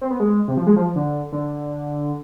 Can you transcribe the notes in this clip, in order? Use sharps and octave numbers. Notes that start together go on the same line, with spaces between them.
C4
B3
G#3
C3
F3
G#3
F3
D3
D3